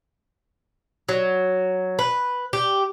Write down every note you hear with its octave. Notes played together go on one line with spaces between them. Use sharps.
F#3
B4
G4